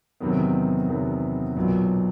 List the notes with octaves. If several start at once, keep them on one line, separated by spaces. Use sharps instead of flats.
E2 C3 D#3 F#3 B3
E2 C3 D#3 F#3 B3
B1 A#2 F#3 B3